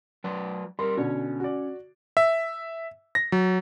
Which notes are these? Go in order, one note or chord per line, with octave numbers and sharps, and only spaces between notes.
F#3 B4 D5
G3 A#4 C6
B2 D3 C#4
F#4 D5
E5
A#6
F#3